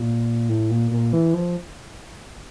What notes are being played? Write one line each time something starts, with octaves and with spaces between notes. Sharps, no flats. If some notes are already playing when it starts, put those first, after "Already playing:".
Already playing: A#2
A2
A#2
A#2
E3
F3